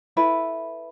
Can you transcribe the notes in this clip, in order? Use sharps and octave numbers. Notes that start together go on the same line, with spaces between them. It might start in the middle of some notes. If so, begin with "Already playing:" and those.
E4 A4 B4 E5